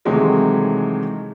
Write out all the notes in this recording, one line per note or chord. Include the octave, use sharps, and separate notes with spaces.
C3 D#3 E3 F#3 G#3 A3